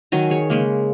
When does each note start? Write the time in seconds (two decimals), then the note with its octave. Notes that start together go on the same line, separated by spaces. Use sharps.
0.12 D#3 F#3 G#5 A#5
0.30 G#4 C#5
0.50 C#3 G#3 A#3